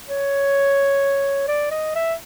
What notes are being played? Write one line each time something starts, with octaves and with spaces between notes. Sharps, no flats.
C#5
D5
D#5
E5